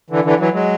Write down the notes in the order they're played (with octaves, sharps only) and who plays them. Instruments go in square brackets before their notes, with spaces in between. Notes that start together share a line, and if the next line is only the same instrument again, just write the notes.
[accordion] D3 E3
D3 E3
E3 F#3
F#3 G#3